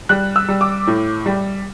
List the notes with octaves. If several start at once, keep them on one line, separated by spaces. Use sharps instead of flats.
G3 F#6
E6
G3
D6
A2
G3